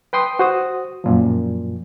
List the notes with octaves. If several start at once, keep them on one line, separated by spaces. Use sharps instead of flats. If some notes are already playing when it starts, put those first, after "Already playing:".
B4 G5 C6 D#6
F#4 C5 D#6
F#2 A#2 F3